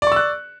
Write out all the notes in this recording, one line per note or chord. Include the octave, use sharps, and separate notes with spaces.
D5 C#6 E6 F#6